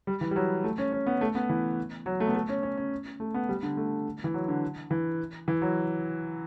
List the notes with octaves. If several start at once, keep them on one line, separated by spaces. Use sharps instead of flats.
G3
E3
G3
F#3
A3
C#4
C#4
B3
A3
B3
E3
F#3
A3
B3
A3
C#4
C#4
C#4
A3
B3
G3
D3
A3
E3
F#3
D3
E3
E3
F#3